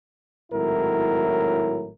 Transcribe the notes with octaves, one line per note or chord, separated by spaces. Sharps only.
G#1 A2 F#3 E4 A#4